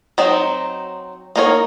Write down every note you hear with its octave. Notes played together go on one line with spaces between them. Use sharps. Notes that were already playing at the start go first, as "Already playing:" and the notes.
F#3 C4 D#4
A#3 D#4 A#4 C#5